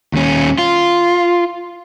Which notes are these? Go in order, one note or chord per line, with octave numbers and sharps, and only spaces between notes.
D#2 C#4
F4